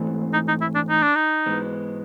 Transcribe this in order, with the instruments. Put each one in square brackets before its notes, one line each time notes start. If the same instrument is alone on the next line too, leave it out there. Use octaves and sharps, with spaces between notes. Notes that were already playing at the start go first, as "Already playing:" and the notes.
Already playing: [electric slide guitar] G#2 E3 A3 C4
[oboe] D#4
D#4
E4
D4
D#4
D4
D#4
[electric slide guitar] G#2 E3 G#3 B3